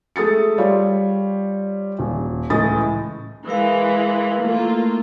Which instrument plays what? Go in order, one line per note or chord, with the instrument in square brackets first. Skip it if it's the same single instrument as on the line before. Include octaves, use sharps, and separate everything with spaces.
[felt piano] G#3 A3 D#6 A6 C#7
G3 F4 C#5
D#1
C#2 A2 E3 D#5 D#6 A6
[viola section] E3 G#3 [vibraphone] E4 A#4 F5
[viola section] A3 A#3 F4